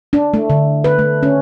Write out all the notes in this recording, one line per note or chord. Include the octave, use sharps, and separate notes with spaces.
D4
A3
D3
B4
A3
C#4